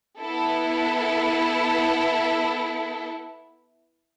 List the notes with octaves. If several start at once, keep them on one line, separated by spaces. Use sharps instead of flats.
B3 E4 A4